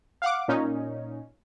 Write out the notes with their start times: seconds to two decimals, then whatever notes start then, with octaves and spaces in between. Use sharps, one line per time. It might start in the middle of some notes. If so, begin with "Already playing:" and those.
0.22 F5 F#5 D6
0.48 A#2 C#4 D#4